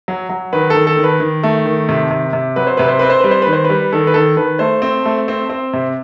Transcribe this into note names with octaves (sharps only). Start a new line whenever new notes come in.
F#3
F#3
D#3 B4
D#3 A4
A4
D#3
B4
D#3
A3
D#3
C3
C3
C3
F#3 B4
C5
C3 B4
C5
C4 B4
C5
G3 B4
C5
D#3 B4
C5
B4
G3
D#3 A4
B4
D#3 A4
D#3 B4
A3 C5
C4
A3
C4
C4
C3